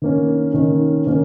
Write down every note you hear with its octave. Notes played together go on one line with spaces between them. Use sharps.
D#3 A#3 C#4
D#3 A#3 C#4
D#3 A#3 C#4